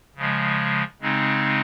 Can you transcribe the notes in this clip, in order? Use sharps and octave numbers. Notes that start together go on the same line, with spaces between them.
C#3 F3 G#3
C#3 G#3 C4 D#4